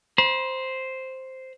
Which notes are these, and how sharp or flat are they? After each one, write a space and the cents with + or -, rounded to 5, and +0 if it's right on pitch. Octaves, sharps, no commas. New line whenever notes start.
C5 +0 B5 -45